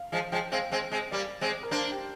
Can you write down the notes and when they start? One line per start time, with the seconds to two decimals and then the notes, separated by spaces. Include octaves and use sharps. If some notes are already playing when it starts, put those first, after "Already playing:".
Already playing: F5
0.12 F3 G#3 F5
0.32 F3 G#3 G5
0.52 G#3 C4 F5
0.72 G#3 C4
0.91 G#3 C4
1.11 G3 A#3 D5
1.41 G#3 C4
1.63 A#4
1.71 A#3 D4 C5
1.91 G4